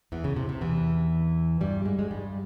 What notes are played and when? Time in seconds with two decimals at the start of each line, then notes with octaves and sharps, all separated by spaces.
0.12 E2 E3
0.24 C#3
0.36 C3
0.49 C3
0.61 E2 E3
1.61 G2 G3
1.85 G#2 G#3
1.99 G#3
2.11 G2 G3